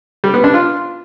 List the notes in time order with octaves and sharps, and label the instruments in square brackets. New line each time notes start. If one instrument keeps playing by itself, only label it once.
[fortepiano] G3
B3
D4
F4